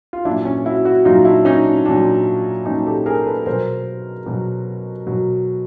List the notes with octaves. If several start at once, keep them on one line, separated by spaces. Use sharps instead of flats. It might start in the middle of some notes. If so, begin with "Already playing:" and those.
F4
A#2 F#3 D4 E4
C#4
E4 F#4
E4 F#4
A#2 F#3 D#4 F4
D4 E4
C#4 D#4
D4
A#2 F#3 D4
A#2 C#4 D#4
F#3
G4 A4
G#4 A#4
A4 B4
B2 F#3 A#4 C5
B2 F#3
B2 F#3